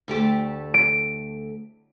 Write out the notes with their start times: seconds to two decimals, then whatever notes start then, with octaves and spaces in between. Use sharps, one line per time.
0.08 D2 A3 G4
0.74 D7